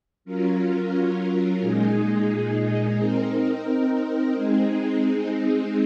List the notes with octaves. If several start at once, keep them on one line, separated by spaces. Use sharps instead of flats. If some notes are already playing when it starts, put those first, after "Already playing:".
F#3 C#4 F4 A#4
A#2 G#3 D#4 G#4
C4 D#4 A#4
G#3 C4 D#4 G#4